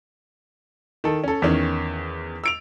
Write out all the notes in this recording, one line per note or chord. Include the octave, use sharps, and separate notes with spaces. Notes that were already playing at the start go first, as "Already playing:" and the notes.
D#3 A4
C#4 A4
E2 D#3 C#4
E6 D7 F7